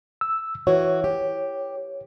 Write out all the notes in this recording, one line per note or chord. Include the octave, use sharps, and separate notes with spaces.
E6
E3 F#4 C#5
G4